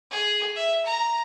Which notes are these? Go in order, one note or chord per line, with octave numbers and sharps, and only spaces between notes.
G#4
E5
A#5